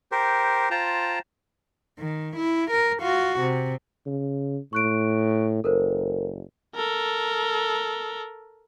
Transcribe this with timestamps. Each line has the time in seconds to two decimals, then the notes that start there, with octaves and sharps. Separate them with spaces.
0.12 G4 A#4 C5
0.71 F4 C5 G5 A5 A#5
1.99 D#3
2.36 E4
2.71 A#4
3.01 F4 F#4
3.39 C3
4.06 C#3
4.73 A2 C#6 F#6 D7
5.64 F#1 A4 A#4 C5
6.75 A4 A#4